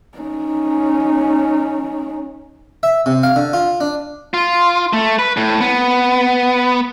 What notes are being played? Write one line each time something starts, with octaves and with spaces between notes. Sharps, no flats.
C#4 D#4
E5
C3
F5
D3
F4
D4
F4
A3
B4
A2
B3